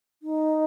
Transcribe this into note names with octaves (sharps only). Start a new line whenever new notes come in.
D#4